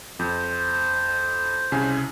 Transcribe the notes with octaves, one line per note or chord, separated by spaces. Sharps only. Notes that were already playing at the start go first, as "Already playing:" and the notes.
F2 C5
C2 C#3 G#5